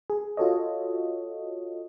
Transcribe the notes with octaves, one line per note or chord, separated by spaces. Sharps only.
G#4
F4 F#4 A4 C#5 D#5